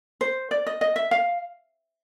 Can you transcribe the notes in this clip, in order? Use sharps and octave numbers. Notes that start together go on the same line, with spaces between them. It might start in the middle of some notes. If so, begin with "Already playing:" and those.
C5
D5
D#5
D#5
E5
F5